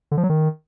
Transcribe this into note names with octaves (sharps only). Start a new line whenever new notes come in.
D3
F3
F#3
D#3